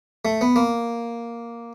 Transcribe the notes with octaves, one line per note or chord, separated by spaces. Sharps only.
A3
B3
A#3